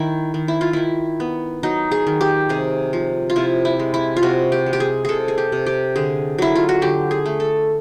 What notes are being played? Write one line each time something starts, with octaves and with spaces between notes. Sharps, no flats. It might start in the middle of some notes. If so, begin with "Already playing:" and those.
Already playing: D#3 E4
D#3
E4
F4
D#3 E4
B3
F#3 D#4
G#4
D#3
G4
C3 G#4
F3
F4
C3 E4
E4
G#3
E4
F4
C3 F#4
G4
G#3
G4
G#4
C3 G#4 A4
G#4
G4
C3
G4
D3 G#4
F#3 E4
F4
F#4
D3 G4
G#4
A3
A4